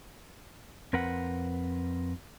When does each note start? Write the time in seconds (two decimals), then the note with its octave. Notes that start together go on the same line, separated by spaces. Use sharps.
0.93 F2 C4 A#4 B4 F#5